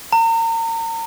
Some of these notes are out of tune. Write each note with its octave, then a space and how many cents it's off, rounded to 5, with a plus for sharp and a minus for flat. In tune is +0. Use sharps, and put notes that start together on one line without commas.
A#5 -35